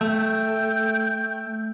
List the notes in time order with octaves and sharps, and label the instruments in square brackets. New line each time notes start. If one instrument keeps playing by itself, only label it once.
[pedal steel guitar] A3 [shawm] G5